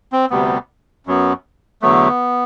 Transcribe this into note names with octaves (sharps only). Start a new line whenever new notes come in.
C4
D2 C3 G3 B3
F#2 F#3 B3
E2 D3 F#3 A3 B3